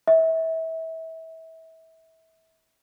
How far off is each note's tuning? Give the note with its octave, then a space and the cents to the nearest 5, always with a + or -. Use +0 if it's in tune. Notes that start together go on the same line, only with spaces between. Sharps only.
E5 -30